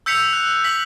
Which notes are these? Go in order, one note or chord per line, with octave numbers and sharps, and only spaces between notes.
E6 G6 B6 C#7 F7
F#6
B6 F#7